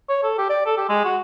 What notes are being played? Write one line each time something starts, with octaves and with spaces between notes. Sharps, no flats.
C#5
A4
G4
D5
A4
G4
G#3
F#4